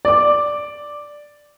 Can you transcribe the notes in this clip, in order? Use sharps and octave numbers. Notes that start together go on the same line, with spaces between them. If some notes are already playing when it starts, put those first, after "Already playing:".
D5 D6